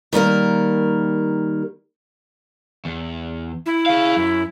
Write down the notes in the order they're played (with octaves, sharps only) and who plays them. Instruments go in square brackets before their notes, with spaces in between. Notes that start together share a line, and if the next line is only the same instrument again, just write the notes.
[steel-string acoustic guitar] D#3 G3 A#3 A#4
[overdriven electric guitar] E2
[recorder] E4
[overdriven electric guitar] G#4 F5
F#2